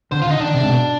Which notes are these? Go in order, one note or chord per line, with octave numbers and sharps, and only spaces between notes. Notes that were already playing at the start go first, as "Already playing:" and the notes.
D3 C5
F4
D3 D#4
D#3 D4
C3
G#2
B2